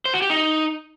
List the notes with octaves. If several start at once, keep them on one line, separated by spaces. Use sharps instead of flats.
C5
F#4
G4
D#4